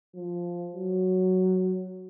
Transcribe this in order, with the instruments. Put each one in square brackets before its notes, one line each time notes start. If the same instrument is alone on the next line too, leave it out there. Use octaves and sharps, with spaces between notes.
[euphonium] F3
F#3